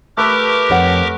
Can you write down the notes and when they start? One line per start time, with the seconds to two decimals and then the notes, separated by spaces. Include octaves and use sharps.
0.17 A3 G4 A#4 B4 D6
0.70 F2 C#5 F#5